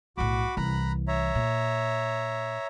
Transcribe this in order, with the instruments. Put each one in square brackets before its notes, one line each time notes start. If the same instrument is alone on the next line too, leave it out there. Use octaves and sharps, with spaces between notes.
[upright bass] B1 A2 [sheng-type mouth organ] F#4 B5 D6
[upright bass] C2 E3 [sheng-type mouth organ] A#5 B5 F#6
[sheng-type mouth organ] C#5 E5 A#5
[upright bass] A#2